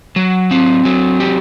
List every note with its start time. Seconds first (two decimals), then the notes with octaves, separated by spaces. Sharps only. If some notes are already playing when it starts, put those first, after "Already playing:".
0.16 F#3
0.51 C4
0.85 F#3
1.20 G4